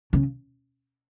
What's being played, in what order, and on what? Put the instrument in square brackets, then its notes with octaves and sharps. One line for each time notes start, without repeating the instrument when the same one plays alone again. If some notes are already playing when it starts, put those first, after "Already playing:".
[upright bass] C#3